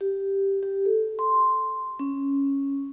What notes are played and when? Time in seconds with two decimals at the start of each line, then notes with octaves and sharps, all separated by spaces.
0.01 G4
0.63 G4
0.85 A4
1.19 C6
1.99 C#4